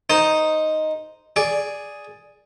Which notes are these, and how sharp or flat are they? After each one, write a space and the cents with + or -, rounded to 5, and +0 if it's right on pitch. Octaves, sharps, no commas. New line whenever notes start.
D#4 +0 C5 -5
G#4 +0 D5 +0